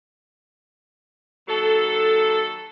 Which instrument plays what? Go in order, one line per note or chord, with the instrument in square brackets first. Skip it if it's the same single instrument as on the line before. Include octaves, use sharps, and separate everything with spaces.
[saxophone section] D#2 F#3 A4